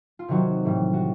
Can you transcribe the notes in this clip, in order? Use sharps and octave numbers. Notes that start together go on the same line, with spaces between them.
F4
C3 D#3 F#3 F#4
A2 E3 G3
F#4